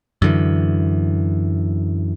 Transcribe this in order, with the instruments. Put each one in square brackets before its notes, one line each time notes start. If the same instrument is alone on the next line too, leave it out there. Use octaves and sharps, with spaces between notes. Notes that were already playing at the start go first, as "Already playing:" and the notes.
[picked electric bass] F#2 D3 E3